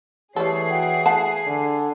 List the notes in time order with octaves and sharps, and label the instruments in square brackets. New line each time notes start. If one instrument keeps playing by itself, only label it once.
[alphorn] E3 [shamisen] G3 A3 A4 [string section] G#4 C7 [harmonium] C#5
[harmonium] F#4 F#5 G5
[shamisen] A3 F#5 A5 [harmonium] G#5
[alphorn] D3